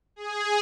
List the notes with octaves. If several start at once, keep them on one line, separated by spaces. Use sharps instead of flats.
G#4